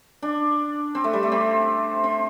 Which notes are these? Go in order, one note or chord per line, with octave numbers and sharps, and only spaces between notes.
D4
C4
A3
G3
A3
C4
C4